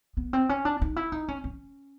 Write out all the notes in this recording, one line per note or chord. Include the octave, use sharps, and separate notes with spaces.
B3
C4
C#4
D4
D#4
E4
D#4
C#4
C#4